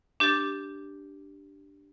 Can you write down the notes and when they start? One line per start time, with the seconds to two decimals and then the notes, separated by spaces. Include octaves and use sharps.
0.20 D4 G4 D6 A6